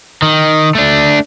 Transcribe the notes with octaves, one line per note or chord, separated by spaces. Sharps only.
D#3
A3 D4